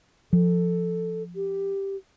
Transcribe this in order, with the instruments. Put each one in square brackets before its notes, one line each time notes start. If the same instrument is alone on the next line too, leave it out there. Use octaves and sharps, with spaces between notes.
[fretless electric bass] F3 [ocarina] A4
[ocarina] G4